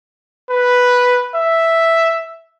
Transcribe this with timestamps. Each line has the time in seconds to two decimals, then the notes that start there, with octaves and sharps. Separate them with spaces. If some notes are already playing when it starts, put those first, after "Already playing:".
0.50 B4
1.36 E5